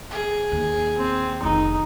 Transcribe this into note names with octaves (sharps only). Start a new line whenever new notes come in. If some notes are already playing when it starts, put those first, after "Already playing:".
G#4
D#2
C4
F1 D#3 D#4